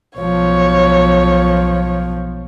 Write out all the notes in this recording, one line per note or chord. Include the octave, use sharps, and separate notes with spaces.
B1 F3 C#5